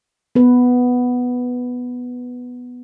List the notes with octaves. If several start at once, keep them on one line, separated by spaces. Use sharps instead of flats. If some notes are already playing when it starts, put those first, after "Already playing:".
B3 B4